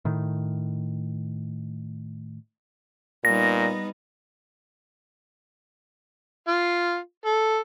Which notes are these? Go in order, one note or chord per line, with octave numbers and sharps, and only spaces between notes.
A2 D#3
A#2 G3 B3 D#4 A#6
F4
A4